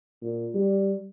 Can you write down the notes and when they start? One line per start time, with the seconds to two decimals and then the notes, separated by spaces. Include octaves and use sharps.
0.23 A#2
0.55 G3